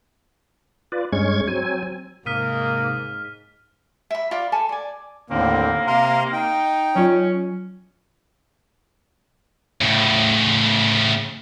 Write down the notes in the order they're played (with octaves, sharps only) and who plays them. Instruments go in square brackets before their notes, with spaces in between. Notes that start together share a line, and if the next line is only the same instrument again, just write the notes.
[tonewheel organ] F4 B4 D5
G2 G#3 C#4 C#6 G#6
F#3 C4 G#5
[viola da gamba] G#2 [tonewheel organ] C3 D#6 [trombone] A#3 [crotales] F6 B6 D#7
[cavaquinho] E5 B5
F4 D5 F5 B5
A4 G#5 A5 B5
D5 G#5
[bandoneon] D#2 A2 D3 [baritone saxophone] A#3 [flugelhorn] C4
[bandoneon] C3 A#5 C6 [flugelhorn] F5
[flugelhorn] D#4 [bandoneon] G5
[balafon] F#3 F4 [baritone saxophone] C#4
[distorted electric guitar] A2 C#3